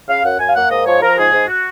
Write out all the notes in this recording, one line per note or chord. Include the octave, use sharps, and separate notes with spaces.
C#3 F5
F#2 F#5
F#2 G#5
F5
A#3 F#5
G#2 D#5
F3 C#5
F3 A#4
G#2 G#4
G#2
F#4